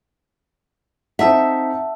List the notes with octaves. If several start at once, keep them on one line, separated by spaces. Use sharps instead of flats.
C4 D#4 A4 E5 F#5 A5 E6